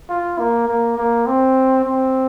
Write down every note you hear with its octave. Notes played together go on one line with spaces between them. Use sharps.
F4
A#3
A#3
A#3
C4
C4